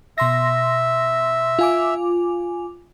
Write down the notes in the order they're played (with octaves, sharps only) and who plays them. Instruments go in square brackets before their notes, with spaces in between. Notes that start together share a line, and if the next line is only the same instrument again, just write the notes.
[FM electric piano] B2 C6 A#6 [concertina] E5
[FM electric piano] F4 G#5 D6